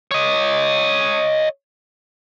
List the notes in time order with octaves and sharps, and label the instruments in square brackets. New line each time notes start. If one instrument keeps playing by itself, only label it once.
[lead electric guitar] C#5 D#5